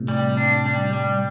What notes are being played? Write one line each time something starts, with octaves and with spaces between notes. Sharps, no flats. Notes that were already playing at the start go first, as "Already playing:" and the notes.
Already playing: A2 C3
G3
D4
G3
G3